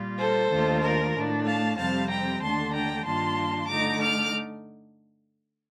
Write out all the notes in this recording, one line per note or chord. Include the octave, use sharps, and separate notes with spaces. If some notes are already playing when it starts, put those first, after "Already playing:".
Already playing: A#2 G3 A#3 F4
A4 C5
D#2 D#3 A3 D4 F4
A#4
A2 A3 D4
F5 A5
F2 C3 G3 C4 F5 A5
G5 A#5
D#2 D3 A3 D4 A5 C6
G5 A#5
G2 D#3 A#3 D4 F4 A5 C6
D3 A3 D#4 A#5 D6
D6 F6